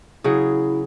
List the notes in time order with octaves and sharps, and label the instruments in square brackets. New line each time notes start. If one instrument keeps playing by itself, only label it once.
[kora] C#3 F#3 G#4 [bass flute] E4